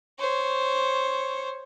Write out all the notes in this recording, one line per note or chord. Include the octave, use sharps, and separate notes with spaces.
C5 C#5